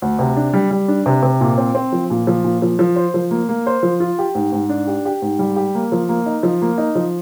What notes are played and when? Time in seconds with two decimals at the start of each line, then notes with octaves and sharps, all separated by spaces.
0.02 D2
0.19 C3
0.36 D4
0.54 G3
0.71 G3
0.88 D4
1.06 C3
1.23 C3
1.41 A#2
1.58 C4
1.75 C4
1.92 F3
2.10 A#2
2.27 F3
2.44 A#2
2.62 F3
2.79 F3
2.96 C5
3.14 F3
3.31 A#3
3.49 A#3
3.67 C5
3.83 F3
4.00 F4
4.19 G4
4.35 G#2
4.52 G#2
4.69 D4
4.87 G4
5.05 G4
5.22 G#2
5.39 G3
5.56 G4
5.75 A#3
5.92 F3
6.09 A#3
6.26 D#4
6.43 F3
6.62 A#3
6.78 D#4
6.95 F3